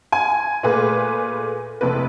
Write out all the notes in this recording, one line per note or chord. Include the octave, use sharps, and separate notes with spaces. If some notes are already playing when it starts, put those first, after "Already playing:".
G#5
A#2 A3 G#4 B4
F1 C3 B4